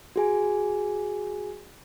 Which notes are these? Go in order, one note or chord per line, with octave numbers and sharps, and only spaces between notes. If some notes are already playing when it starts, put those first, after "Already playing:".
F#4 G#4 G#5